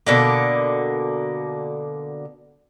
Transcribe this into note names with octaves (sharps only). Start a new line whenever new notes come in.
B2 D3 A#3